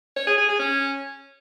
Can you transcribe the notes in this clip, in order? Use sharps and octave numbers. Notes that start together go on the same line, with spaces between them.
C#5
G#4
G#4
G#4
C#4